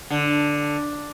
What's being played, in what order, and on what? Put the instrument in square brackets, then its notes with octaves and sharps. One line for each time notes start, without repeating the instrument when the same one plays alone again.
[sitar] D3